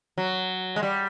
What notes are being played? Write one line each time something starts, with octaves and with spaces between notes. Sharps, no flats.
F#3
G#3
G3